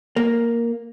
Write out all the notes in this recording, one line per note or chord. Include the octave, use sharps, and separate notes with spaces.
A#3